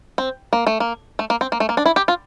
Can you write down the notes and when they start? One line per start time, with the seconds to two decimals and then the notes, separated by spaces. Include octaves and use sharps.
0.18 C4
0.53 A#3
0.67 A3
0.80 A#3
1.19 A3
1.30 A#3
1.41 C4
1.52 A#3
1.60 A3
1.69 A#3
1.77 D4
1.86 E4
1.96 G4
2.08 F4